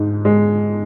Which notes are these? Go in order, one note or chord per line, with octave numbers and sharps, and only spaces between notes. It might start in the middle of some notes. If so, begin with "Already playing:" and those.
Already playing: G#2 G#3
G#3